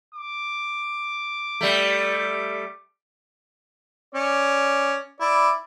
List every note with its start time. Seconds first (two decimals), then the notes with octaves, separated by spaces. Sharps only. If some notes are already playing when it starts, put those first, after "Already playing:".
0.15 D6
1.61 G3 A3
4.15 C#4 D5
5.21 E4 D5